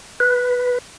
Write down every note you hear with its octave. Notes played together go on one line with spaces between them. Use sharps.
B4